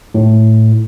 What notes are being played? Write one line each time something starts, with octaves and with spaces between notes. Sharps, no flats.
A2